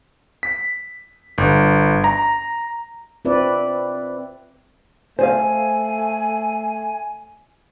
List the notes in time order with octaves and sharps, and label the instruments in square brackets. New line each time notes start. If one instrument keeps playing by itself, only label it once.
[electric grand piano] B6
G1
A#5
[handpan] C4 F4 B4 D5 E5
[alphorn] A3 [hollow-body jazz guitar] C5 F5 [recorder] G#5